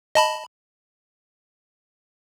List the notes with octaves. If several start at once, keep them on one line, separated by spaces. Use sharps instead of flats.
D#5 A5 B5